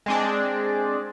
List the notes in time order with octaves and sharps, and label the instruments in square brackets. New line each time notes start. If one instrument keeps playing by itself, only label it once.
[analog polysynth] G#3 C4 D4